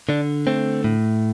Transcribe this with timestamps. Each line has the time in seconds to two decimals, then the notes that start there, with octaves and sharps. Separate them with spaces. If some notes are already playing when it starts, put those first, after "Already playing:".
0.09 D3 D4
0.47 A3 C4
0.84 A2